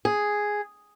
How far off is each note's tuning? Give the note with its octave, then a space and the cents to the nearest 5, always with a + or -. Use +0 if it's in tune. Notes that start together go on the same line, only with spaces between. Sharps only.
G#4 +0